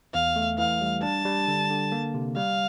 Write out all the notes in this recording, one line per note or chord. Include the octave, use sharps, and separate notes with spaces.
E2 F5
A3
E3 F5
G3
D4 A5
G3
D3
D3
A#3
C3
G3 F5